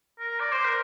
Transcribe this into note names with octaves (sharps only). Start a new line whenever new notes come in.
A#4
D5
C5
A#4